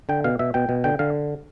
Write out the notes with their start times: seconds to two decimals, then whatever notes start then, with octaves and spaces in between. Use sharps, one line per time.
0.09 D3 G5
0.24 B2 F5
0.39 B2 E5
0.54 B2 G5
0.69 B2
0.84 D3 G5
0.99 D3 F5